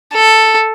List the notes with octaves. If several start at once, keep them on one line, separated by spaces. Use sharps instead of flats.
A4